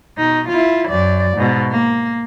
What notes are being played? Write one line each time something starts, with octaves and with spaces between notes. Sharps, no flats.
B2 D#4
E4 F4
F#2 D5
G#2 B2
A#3